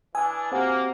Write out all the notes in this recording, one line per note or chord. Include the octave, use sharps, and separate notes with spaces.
E3 D4 G#5 D#6 E6
A#3 C4 F#4 G4 C5 F#5